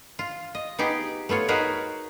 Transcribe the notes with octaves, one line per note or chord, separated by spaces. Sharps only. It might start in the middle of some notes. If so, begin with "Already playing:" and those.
F4
D#5
B3 D#4 G4 G#4
A3 B3 F4 C#5
D#4 F#4 G#4 A#4 B4